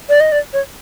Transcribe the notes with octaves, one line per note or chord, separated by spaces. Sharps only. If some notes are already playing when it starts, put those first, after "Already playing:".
D5
D#5
D5
C#5